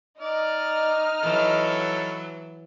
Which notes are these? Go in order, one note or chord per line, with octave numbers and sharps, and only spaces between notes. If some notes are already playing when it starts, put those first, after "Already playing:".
D#4 D5 D#5 F6
E3 F#3 A4 B4 C#5